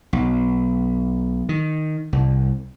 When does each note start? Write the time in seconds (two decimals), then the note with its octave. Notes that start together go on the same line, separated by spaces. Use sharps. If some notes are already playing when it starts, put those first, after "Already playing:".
0.13 B1
1.49 D#3
2.13 C2